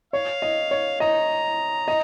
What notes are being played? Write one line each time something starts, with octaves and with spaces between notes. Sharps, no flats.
C#5 F5
D#5
C#5
D#5 A#5
D#5